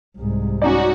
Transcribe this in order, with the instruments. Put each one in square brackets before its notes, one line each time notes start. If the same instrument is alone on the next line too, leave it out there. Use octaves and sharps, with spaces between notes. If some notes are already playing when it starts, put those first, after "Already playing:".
[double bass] C2 G#2
[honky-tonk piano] C#4 D#4 D5 [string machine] F#4